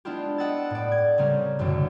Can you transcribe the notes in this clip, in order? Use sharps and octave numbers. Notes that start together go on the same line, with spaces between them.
G#3 B3 D4 E4 F4 G4
D#5 F#5 G5 E6 A6
A2 D5
G#6
C#3 G3 C4 C#4 A#4
A1 F#2 B2 D3 E3